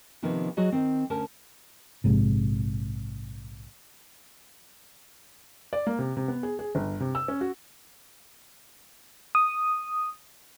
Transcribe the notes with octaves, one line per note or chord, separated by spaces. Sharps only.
C3 D#3 F3 A#3 B3
F#3 F#4 G#4 D#5
D#3 C4
D2 C#4 A#4 A5
A#1 G#2 C3
D5
A#3
C3
C3
B3
G#4
G#4
G1
C3
E6
C#4
F#4
D#6